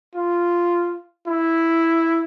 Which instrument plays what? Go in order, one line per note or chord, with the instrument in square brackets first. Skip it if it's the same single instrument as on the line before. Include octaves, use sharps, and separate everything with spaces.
[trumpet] F4
E4